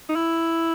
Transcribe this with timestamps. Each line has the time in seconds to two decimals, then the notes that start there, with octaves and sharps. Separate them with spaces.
0.09 D#4
0.16 E4